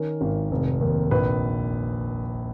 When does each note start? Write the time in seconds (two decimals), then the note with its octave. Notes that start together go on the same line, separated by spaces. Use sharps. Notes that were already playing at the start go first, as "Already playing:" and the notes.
Already playing: D#3 C#4 A#4
0.21 G#1
0.51 F1
0.81 D#2
1.11 A#1 B4